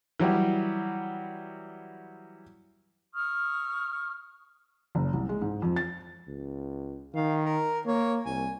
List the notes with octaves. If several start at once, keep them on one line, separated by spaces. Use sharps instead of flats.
E3 F#3 G3
C#6 D#6 F6
F#1
C2
G#3
G#2
F2
A6
C#2
D#3 F5
A#4
A#3 C#5
C2 G#5